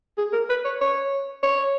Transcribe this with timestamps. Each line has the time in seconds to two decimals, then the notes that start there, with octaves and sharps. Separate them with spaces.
0.18 G#4
0.33 A#4
0.50 B4
0.65 C#5
0.81 C#5
1.43 C#5